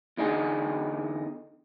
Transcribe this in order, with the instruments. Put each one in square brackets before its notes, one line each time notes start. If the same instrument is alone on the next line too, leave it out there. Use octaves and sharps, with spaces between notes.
[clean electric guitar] E2 D3 D#4 G#4